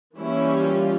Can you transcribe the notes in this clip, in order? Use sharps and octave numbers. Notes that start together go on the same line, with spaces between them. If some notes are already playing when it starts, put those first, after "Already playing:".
E3 G3 A#3 C#4 E4
F4